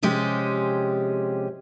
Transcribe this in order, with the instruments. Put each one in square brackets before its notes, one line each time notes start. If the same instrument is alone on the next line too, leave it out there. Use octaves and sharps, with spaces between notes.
[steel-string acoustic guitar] C3 F3 G#3 C#4 G4